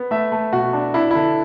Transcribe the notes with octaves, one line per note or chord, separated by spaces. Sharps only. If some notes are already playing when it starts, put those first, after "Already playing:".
Already playing: B3
A3 E5
A3
B2 F#4
D4
D4 E4
D3 E4